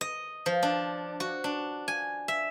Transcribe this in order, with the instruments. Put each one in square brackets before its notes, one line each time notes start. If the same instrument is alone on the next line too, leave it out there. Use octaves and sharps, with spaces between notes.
[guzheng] D#5
F3
D4
F#4
D4
G#5
E5